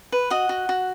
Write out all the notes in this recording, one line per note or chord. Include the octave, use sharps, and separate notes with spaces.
B4
F#4 D#5 F#5
F#4
F#4